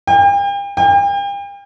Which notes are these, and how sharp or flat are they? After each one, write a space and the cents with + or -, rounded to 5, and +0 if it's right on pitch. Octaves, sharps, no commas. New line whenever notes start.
G5 +40
G5 +40